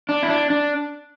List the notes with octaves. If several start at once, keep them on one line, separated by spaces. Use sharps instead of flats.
D4
E4
D4
D4